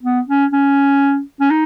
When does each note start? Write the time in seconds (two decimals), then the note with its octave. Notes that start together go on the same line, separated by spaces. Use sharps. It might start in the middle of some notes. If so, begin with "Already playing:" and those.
0.03 B3
0.28 C#4
0.52 C#4
1.40 C#4
1.50 D#4